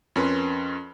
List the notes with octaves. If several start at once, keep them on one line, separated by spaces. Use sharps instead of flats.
F2 C#4 A#4 B4 C6